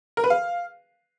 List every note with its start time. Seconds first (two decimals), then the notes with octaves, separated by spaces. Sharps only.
0.17 A#4
0.24 B4
0.30 F5